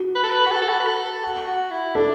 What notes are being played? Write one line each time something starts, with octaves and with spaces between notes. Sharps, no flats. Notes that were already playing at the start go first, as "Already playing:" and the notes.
Already playing: F#4
B4
A4
B4
F#4
A4
A4
F#4
B4
A4
A4
F#4
F#4
E4
D4 A4